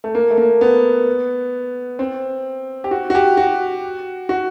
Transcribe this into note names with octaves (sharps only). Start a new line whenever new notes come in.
A3
A#3
A3
A#3
B3
C4
G4
F#4
F#4
G4
F#4
F#4